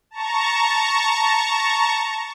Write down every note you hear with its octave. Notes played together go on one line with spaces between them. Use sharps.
A5 A#5 C#6